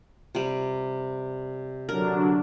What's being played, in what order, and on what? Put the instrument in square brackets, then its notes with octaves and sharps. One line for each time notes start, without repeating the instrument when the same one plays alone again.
[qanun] C3 G3
[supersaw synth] D3 F#3 D4 [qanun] A#4